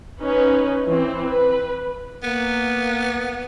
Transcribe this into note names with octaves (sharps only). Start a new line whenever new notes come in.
C#4 D#4 B4
E3 C4
B4
A#3 B3